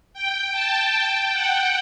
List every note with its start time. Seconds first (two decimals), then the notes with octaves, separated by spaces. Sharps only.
0.14 G5
0.53 A5
0.92 G5
1.32 F#5